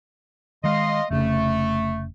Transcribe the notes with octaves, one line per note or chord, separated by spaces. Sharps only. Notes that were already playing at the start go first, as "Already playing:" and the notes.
D#3 G#3 D#5 F5 C6
F1 C#3 A3